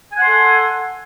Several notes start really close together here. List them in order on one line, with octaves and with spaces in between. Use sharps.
G#5 F#5 C6 A4